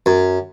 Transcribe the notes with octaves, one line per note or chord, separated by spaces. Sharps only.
F#2